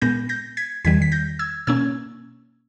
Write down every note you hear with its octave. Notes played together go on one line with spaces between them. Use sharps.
A#2 G#3 B3 G6 A#6
G6 A#6
G#6 B6
E2 D#3 G3 G#6 B6
B6
G6 A#6
E6 G#6
B2 A#3 C#4 E6 G#6